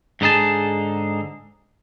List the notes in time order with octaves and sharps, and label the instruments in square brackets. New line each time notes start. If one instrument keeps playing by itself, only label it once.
[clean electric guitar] G#2 D3 D#4 G#4 A5